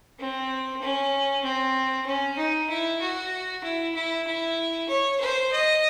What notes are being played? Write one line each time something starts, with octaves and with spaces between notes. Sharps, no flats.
C4
C#4
C4
C#4
D#4
E4
F#4
E4
E4
E4
C#5
C5
D#5